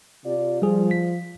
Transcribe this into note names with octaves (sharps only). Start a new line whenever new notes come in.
C3 F4 D5
F3 G3 G#4
B6